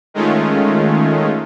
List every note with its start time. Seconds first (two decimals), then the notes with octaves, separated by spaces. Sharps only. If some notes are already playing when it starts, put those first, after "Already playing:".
0.14 D#3 G#3 A3 C#4 F4